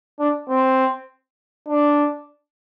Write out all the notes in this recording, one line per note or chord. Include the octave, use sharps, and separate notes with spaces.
D4
C4
D4